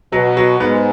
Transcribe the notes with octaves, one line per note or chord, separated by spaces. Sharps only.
B2 F#3
F#3
G#2 B3